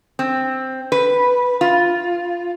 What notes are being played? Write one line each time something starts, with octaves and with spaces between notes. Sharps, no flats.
C4
B4
F4